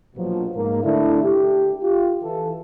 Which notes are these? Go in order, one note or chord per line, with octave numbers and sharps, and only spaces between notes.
A#1 B2 F3 F#3
G#2 A#3
D3 A3 D4 E4
G4
F4 G4
E3 A4